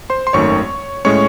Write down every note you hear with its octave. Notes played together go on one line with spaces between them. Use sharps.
C5 C6
C6
G#1 F#2 D#3 A3 C#5 C#6
A2 G#3 C#4 C#5 C#6